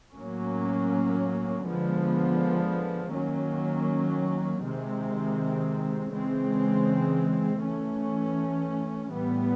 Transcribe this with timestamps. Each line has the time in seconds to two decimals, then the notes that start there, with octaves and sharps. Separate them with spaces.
0.14 A2 F#3 A#3 C#4
1.63 D3 F3 G#3 B3
3.12 D#3 F#3 A#3 C#4
4.62 C3 D#3 G#3 C4
6.11 C#3 E3 G#3 C4
7.60 E3 A3 C#4
9.09 A2 E3 G3 B3